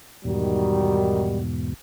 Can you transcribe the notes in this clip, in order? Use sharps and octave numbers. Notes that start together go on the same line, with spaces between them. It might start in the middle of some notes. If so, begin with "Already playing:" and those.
E2 G#2 B2 D#3 G3 F#4